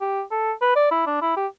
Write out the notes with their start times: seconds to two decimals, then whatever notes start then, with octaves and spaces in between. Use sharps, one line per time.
0.01 G4
0.31 A4
0.62 B4
0.76 D5
0.91 E4
1.07 D4
1.22 E4
1.37 G4